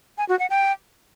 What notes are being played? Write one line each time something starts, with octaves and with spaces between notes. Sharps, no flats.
G#5
F#4
F#5
G5